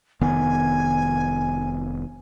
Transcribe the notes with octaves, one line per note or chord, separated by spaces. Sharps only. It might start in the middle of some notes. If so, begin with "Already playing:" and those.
F1 D#3 B3 G#5